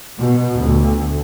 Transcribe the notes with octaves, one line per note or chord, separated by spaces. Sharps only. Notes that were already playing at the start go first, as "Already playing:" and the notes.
B2
D2